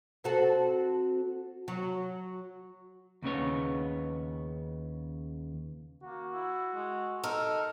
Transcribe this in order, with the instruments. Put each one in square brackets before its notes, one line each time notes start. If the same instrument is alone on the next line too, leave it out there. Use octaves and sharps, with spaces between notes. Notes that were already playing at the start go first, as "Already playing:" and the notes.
[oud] C4 F#4 A4
F#3
[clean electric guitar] D#2 C#3 B3 C#5
[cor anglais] A#3 [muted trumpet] F#4
[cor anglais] E4
G#3
[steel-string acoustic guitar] D#4 A#4 [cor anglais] A4